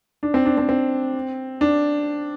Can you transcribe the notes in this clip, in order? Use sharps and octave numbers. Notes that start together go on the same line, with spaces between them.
D4
C4
D4
C4
C4
D4